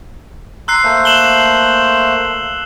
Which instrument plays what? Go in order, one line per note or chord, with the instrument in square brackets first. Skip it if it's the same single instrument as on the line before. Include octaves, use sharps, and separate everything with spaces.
[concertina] A#5 C6 [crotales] E6 F#6 C7
[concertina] A3 A#3 C5
[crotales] E7 F#7 G7